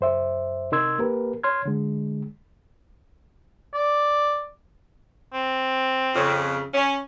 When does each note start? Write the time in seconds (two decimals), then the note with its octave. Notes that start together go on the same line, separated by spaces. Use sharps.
0.01 F#2 C5 E5
0.72 C3 D#4 A#4 C6 E6 G#6
0.98 A#3 G4 A#4 B4
1.43 C#5 C6 F6 G#6
1.65 D3 G#3
3.74 D5
5.34 C4
6.15 F2 C#3
6.74 C#4